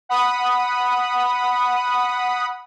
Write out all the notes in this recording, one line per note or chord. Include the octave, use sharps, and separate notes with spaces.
F#5 B5 D#6